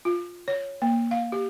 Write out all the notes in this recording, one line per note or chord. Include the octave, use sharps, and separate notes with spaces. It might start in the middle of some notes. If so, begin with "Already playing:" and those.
F4
C#5
A#3
F5
G4